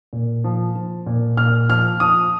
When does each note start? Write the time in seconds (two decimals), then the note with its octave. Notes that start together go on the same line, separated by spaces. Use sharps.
0.13 A#2
0.44 F3
0.76 F3
1.06 A#2
1.37 A#2 F6
1.69 F3 F6
2.00 F3 D#6